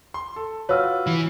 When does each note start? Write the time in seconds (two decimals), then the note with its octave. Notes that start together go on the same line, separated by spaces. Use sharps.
0.14 C6
0.36 A4
0.69 F4 F#4 B4 C#5 E6 F6
1.07 E3